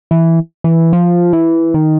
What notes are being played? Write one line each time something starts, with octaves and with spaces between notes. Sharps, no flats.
E3
E3
F3
E3
D#3